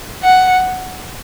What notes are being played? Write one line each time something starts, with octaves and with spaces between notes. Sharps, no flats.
F#5